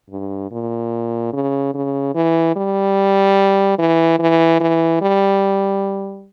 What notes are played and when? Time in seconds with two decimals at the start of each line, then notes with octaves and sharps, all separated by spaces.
0.10 G2
0.51 A#2
1.33 C#3
1.74 C#3
2.14 E3
2.56 G3
3.79 E3
4.19 E3
4.60 E3
5.02 G3